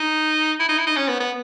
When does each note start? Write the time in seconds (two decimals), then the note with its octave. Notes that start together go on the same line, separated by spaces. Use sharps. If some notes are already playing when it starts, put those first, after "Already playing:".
Already playing: D#4
0.59 E4
0.69 D#4
0.78 E4
0.87 D#4
0.96 C#4
1.08 B3
1.20 B3